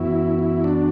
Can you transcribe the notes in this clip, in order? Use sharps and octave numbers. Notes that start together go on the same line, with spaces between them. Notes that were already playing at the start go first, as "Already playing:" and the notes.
Already playing: F#2 E3 B3 E4 F#4
E4
D4